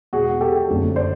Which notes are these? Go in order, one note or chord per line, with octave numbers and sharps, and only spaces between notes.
E2 B2 G#3 F#4 G#4
G4 A4
F#1 F2 D3 F#3 A3
C5 D5